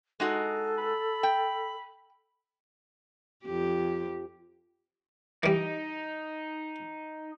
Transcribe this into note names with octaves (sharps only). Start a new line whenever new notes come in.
G#3 D#4 F#4 A4
B5
G5
F2 G4
E3 G3 D#4